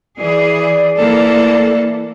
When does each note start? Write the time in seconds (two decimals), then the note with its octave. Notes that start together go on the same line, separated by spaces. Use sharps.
0.19 E3 G#4 D5
0.96 E3 A#3 A4